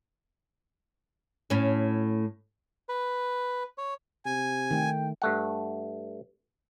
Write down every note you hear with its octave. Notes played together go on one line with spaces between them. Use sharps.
A2 C#4
B4
C#5
C3 G#5
D#3 A3 G5
G2 A3 F#5